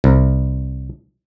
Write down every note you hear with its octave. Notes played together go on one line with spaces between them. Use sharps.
C2